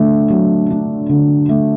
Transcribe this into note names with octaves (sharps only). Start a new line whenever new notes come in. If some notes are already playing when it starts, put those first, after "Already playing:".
Already playing: D3 A3
F#3
D4
D3
A3